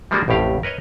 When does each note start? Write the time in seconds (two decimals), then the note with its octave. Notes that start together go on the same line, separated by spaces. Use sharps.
0.11 F3 G3 G#3 A#3 D4 F#4
0.28 A1 F2 A2 G4 F5
0.63 A#4 B4 C#5 D#5